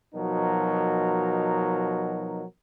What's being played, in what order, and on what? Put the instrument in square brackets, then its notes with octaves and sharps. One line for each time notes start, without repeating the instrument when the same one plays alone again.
[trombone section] B2 F3 F#3 D#4 A#4